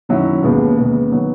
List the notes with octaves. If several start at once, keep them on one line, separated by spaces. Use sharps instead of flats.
F#2 D#3 F#3 C#4 E4
D#2 C#3 G#3 B3
D#2 C#3 G#3 B3
D#3 F#3 B3